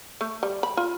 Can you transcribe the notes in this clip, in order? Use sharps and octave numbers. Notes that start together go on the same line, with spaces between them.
A3
G3
B5
F4